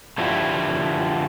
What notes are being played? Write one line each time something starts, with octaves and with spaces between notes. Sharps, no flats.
D3 F3 E4 F4 G4